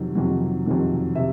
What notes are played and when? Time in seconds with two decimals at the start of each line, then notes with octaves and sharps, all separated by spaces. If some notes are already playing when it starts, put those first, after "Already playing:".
Already playing: F2 C3 D#3 F#3
0.15 F2 C3 D#3 F#3
0.66 F2 C3 D#3 F#3
1.15 C3 E5